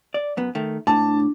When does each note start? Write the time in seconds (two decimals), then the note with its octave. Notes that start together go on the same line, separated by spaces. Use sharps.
0.14 D5
0.37 F#2 B3
0.55 D#3 A3
0.87 A2 D4 A5